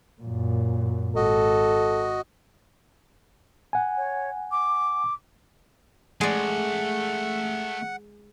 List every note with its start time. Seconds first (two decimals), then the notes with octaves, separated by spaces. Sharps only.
0.22 F#2 A#2
1.16 G#1 F#4 A4 D#5
3.73 F#5 G#5
3.97 C#5
4.51 D6
6.21 G#3 A3 D5 F#5 G#5